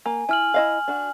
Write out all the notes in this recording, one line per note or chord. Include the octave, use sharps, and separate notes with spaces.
A#3 G#5
E4 G#5 F6 F#7
E4 D#5 F5
D4 F#4